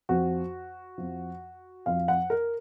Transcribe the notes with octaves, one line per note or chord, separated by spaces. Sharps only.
F2 F3 F#4
F2 F3
F2 F3 F5
F#5
A#4